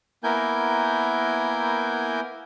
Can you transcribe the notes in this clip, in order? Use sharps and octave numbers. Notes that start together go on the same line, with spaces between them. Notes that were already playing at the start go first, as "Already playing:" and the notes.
A#3 B3 E4 A#4 G#5 G6